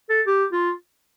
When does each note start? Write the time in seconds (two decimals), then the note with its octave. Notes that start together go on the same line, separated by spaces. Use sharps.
0.09 A4
0.26 G4
0.52 F4